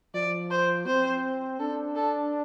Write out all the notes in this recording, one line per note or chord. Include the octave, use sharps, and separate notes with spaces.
F3 D5
C5
C4 C5
D4 A4
A4